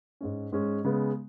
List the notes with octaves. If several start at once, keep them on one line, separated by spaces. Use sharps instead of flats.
G#2 G#3 C#4
G#2 G#3 C#4
C#3 G#3 B3